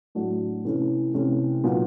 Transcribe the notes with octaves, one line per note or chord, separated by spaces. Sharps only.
A2 F#3 A3 D4 F#4
C3 E3 A3 C#4
C3 E3 A3 C#4
A#2 F#3 B3 D#4